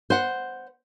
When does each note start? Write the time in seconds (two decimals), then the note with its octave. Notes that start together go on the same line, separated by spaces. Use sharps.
0.10 C5 F#5